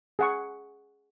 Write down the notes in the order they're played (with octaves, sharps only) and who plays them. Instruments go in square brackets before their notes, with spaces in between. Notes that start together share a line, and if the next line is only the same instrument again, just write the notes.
[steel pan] G#4 F#5 C#6